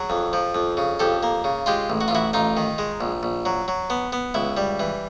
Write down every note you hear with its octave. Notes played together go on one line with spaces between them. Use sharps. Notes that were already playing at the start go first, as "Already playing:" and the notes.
Already playing: F#3 G#4
F2
F3
F2
C#3
F2 G4 A4
A#3
C#3
G#3 F4 G4
A1
F#4
F4
A1 E4 F#4
A1 D#4 F4
D#3
G#3
A#1
A#1
F#3
F#3
B3
B3
C#2 E4
G3
E3